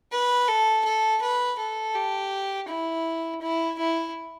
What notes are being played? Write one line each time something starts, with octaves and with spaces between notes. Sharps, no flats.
B4
A4
A4
B4
A4
G4
E4
E4
E4